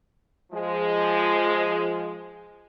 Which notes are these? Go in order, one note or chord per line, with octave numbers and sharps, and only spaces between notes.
F3 G#3